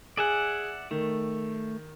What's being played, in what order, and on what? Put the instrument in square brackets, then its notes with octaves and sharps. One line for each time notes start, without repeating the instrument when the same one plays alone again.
[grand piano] G#4 [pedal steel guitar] D5 E5 F#5
[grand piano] D#3 [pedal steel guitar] A3